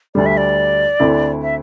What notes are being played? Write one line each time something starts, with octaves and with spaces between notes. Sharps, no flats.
D2 D3 G3 D5
E5
D5
D2 D3 C4 E4
E5